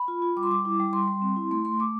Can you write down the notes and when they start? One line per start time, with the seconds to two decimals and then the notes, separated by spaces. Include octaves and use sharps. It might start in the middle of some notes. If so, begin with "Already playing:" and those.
Already playing: B5
0.08 F4
0.22 F4
0.37 G3 D6
0.43 C6
0.51 G3 D6
0.65 E4
0.80 G3
0.93 G3 C6
1.08 G3
1.22 C4
1.36 E4
1.51 A3 C6
1.65 A3 C6
1.80 A3 D6